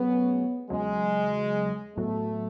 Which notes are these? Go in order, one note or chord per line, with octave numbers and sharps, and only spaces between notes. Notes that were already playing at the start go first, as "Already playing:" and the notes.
Already playing: F#3 A3 B3 C#4 G#4 C#5
E2 C#3 F#3 G#3
A2 F#3 A3 B3 F#4